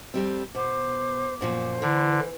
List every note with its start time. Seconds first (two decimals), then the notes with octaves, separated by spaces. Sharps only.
0.14 F2 G3 C4
0.55 B2 C5 D6
1.41 F#2 A#2 F3 C5
1.82 D3 E3 E4